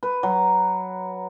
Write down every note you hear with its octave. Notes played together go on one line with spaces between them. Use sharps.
B4
F#3